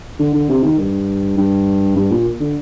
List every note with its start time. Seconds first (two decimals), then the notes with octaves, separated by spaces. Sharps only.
0.19 D3
0.34 D3
0.49 C3
0.64 D#3
0.79 G2
1.37 G2
1.96 G2
2.11 A#2
2.40 D3